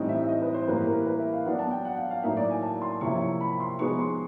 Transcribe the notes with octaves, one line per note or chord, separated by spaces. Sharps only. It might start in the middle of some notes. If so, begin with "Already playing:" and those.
Already playing: A2 E3 G3 C4 D#4 D#5
E5
E5
D#5
B4
C5
A2 E3 G3 A#3 B4
A#4
B4
E5
F5
F#3 B3 D4 F#5
A5
G5
F#5
F5
F5
A2 F#3 A#3 D#4 E5
D5
G#5
A5
C6
C3 F3 A#3 C#4 E4 C#6
C#6
B5
C6
F3 G#3 B3 D#4 C#6
C6